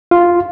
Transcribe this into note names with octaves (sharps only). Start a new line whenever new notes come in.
F4